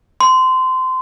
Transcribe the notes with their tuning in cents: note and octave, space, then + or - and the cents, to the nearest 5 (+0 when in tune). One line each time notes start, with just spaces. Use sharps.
C6 -20